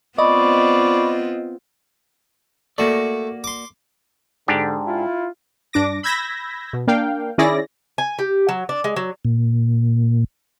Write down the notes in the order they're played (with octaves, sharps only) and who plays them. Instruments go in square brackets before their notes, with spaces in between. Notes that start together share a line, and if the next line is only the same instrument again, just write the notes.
[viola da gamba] B3 C4 F4 [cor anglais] D5 [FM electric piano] D#5 [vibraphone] B5 C#6
[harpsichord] A3 [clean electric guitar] A#3 F#4 D5
[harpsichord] C6 D6
[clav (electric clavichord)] G#2 D4 G4 [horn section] D3
[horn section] E4 F4
[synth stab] G2 D4 D6 A#6
B5 E6 G6 G#6 A#6 B6
B2
A#3 D4 F5 G5
D#3 C#4 E4 G#4 D5 A#6
[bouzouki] G#5
G4
F#3
D4
G#3
F#3
[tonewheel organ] A#2